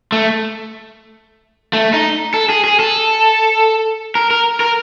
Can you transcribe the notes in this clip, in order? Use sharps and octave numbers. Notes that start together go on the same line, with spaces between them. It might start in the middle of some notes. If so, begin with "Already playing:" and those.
A3
A3
D#4
A4
G#4
G#4
A4
A#4
A#4
A#4